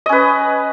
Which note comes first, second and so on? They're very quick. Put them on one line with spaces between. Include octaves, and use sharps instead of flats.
D#5 C#4 B4